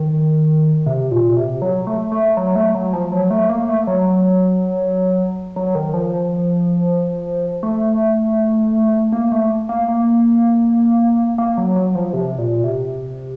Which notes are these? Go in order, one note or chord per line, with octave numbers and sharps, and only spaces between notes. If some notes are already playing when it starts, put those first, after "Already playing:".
Already playing: D#3
C3
A#2
C3
F#3
A3
A3
F#3
A3
F#3
F3
F#3
A3
A#3
A3
F#3
F#3
D#3
F3
A3
A#3
A3
A#3
A#3
A#3
F#3
F#3
F3
C3
A#2
C3